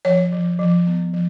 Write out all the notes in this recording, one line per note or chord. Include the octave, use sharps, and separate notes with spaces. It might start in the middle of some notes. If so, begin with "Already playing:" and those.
F3 C#5
F3
F3
B3
F3